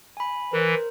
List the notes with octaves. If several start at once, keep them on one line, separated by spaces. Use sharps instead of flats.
G#5 B5
E3 A#4 C5